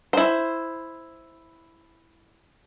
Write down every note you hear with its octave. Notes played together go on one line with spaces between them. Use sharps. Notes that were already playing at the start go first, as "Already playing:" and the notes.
E4 C5